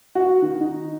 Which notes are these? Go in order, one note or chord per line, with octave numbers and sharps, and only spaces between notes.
F#4
D#3
D#4